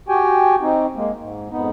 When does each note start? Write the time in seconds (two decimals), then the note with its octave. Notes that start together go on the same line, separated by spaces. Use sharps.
0.09 F#4 G4 G5 G#5
0.61 C4 D#4
0.95 G#3 A#3
1.19 G#2
1.50 F2 G#2 B3 D#4